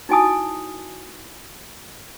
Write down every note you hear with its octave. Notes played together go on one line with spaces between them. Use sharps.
D#4 E4 F#4 G#5 A5 D#6